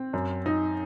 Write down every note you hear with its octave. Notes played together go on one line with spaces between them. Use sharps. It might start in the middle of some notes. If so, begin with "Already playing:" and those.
Already playing: C4
F#2
D#4